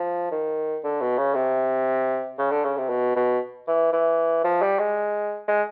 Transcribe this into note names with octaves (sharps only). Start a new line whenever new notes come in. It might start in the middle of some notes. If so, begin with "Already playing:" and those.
Already playing: F3
D#3
D3
B2
C#3
C3
C#3
D3
C#3
C3
B2
B2
E3
E3
F3
G3
G#3
G#3